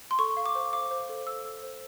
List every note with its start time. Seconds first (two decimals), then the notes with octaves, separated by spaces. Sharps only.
0.11 C6
0.19 A4 C#6
0.37 F5
0.46 D6
0.55 C5
0.73 F5 D6
0.91 C5
1.09 A4
1.26 A4 E6
1.45 A4
1.63 C5